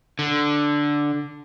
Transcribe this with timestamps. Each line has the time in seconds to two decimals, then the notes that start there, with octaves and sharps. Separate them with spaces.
0.19 D3